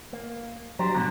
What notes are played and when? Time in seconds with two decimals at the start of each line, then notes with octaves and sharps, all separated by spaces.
0.13 A#3
0.79 F#3 D4 G4 C5 A#5
0.95 G#2 B2 D3